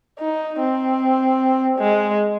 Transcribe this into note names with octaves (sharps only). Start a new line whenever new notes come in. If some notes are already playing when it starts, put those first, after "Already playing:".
D#4
C4
G#3